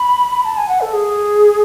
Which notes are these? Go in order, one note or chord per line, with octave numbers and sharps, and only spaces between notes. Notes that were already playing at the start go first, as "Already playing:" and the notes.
Already playing: B5
A5
G#5
F#5
A4
G#4